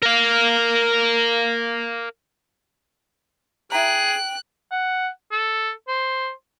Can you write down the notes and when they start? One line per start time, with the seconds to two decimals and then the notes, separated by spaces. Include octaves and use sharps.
0.03 A#4 F5
3.72 E4 G#4 G5 A#5 F#6
4.71 F#5
5.31 A4
5.88 C5